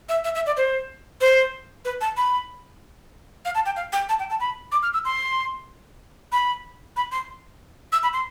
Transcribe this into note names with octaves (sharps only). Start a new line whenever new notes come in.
E5
E5
E5
D5
C5
C5
B4
A5
B5
F5
A5
G5
F5
G5
A5
G5
A5
B5
D6
F6
E6
C6
B5
B5
C6
E6
B5
C6